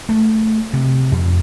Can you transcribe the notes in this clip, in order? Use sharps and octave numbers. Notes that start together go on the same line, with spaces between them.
A3
C3
F2